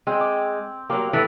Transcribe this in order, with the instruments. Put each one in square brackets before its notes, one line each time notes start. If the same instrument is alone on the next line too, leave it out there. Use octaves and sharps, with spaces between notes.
[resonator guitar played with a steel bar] G#3 [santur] C4 G5
[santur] D6
[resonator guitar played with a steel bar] F#3 A#3 [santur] G3 C6 D6
[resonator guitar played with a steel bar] A2 E3 [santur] A4